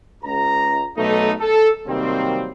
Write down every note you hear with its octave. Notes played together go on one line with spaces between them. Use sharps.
C#2 A#5
B1 A3 D#4
A4
C3 D#3 F#3 G3 A#3 C4